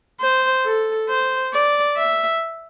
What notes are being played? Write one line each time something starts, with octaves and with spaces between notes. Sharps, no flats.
C5
A4
C5
D5
E5